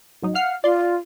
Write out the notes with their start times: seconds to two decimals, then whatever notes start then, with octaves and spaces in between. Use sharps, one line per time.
0.22 A1 F#3 D#4
0.35 F5 F#5 F6 C7
0.64 F4 D5 C6